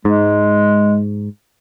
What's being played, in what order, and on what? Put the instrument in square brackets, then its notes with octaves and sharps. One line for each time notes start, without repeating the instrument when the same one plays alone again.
[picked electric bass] G#2 [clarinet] G#3